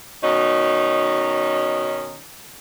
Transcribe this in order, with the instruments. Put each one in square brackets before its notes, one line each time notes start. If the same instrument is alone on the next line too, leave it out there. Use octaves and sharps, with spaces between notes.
[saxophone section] B2 D#3 C#4 D#4